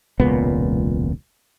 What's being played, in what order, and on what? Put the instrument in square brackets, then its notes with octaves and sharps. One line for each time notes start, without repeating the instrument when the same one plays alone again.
[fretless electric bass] E1 C#2 A#2 B3